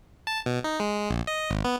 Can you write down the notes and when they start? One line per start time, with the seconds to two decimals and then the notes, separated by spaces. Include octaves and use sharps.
0.27 A5
0.46 B2
0.64 D#4
0.80 G#3
1.10 A#1
1.27 D#5
1.50 G#1
1.65 B3